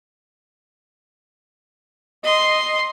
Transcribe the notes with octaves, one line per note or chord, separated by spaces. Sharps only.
D#5 C6